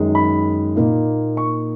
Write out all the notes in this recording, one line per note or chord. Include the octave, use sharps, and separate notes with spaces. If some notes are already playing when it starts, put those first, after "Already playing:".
Already playing: F#2 D#3 G#3
B5
A#2 A#3 D#4
C#6